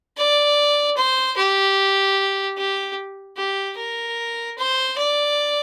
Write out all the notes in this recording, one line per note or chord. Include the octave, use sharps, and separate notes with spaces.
D5
C5
G4
G4
G4
A#4
C5
D5